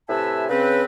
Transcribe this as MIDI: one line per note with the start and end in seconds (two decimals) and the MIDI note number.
0.09 0.45 45
0.09 0.45 48
0.09 0.45 71
0.09 0.45 76
0.09 0.45 80
0.09 0.45 81
0.49 0.84 49
0.49 0.84 60
0.49 0.84 71